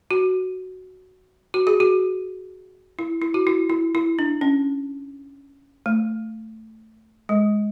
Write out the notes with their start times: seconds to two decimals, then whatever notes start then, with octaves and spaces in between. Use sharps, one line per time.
0.11 F#4
1.54 F#4
1.67 G#4
1.80 F#4
2.99 E4
3.22 E4
3.34 F#4
3.47 E4
3.70 E4
3.95 E4
4.19 D4
4.41 C#4
5.86 A3
7.29 G#3